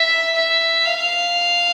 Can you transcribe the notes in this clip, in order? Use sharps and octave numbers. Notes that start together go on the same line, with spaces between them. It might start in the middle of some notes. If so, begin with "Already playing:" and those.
Already playing: E5
E5
F5